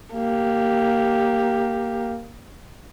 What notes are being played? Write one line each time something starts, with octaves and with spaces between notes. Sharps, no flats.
A#3 G4